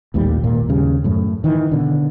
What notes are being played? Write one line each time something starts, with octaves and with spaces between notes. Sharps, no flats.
A1 D#2 A#2 G3
G#1 A#2 A#3
D#2 C#3 G3
F#2 A2
D#3 E3
B2 D3